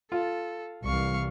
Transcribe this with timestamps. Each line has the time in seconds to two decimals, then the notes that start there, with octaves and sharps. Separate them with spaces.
0.12 F4 A4
0.84 C2 E3 G3 F5 C#6